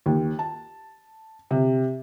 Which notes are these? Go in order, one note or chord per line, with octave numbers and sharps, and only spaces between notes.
D#2
A5
C3